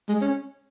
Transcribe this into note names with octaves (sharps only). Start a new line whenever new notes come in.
G#3
C#4